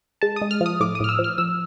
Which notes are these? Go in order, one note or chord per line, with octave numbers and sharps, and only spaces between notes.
G#3 A5
D#6
G#3
F6
F3 D#6
A2 D6
D#6
A2 F6
E6
F3
F6
F3 E6